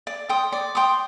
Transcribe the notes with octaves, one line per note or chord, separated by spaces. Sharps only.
D5
G5 C6 D#6
D5
G5 C6 D#6